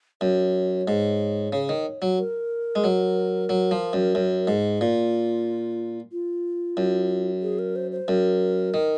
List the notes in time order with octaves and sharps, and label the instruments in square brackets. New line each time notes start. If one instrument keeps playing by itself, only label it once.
[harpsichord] F#2 [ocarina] C#5
[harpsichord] G#2
C#3
D#3
F#3
[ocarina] A#4
[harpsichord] G#3
F#3
F#3
F3
F#2
F#2
G#2
[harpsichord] A#2 [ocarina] F4
[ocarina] F4
[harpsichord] F#2
[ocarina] G#4
A#4
C5
C5
[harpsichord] F#2 [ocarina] A#4
[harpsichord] D#3